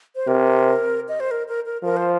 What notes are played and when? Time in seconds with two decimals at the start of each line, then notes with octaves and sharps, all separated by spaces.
0.16 C5
0.27 C3 A#4
1.09 D#5
1.20 C5
1.31 A#4
1.48 A#4
1.66 A#4
1.83 F3 A#4
1.97 C5